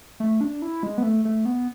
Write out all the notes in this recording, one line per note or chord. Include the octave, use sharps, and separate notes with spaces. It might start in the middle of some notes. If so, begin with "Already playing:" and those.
A3
D4
E4
G#3
B3
A3
A3
B3